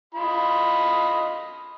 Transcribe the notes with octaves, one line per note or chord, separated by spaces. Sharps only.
F4 D#5 B5